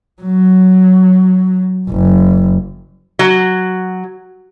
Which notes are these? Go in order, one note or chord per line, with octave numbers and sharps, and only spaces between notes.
F#3
F#1
F#3